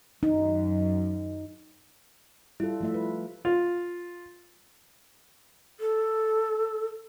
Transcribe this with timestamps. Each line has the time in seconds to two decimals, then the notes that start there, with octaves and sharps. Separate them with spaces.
0.23 F#2 D#4
2.60 G3 E4 F4 A4
2.81 F3 A3 E5
2.94 B4
3.45 F4
5.80 A4